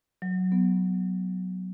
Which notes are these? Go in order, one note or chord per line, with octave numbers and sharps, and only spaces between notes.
F#3
B3